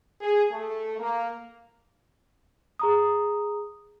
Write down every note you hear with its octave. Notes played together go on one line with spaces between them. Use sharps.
G#4
A3 A4
A#3
G#4 A#5 D#6